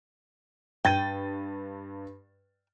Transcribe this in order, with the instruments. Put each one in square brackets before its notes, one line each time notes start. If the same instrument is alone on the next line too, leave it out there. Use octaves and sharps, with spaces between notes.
[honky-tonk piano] G2 A6 D#7 [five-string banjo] G5